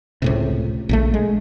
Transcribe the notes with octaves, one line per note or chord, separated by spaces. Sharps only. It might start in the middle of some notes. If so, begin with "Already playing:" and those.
C#2 A2 C3
A#1 C#3 A3
G#3